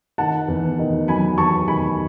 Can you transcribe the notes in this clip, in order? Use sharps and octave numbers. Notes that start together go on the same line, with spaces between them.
D#3 F#5 A5
E2
D#3
F#3 G#5 B5
E2 A5 C#6
D#3 G#5 B5